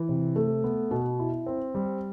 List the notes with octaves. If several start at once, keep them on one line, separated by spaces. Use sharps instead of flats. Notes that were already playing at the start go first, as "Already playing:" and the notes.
Already playing: E3
C3
A3
B3
B2
E4
C4
G3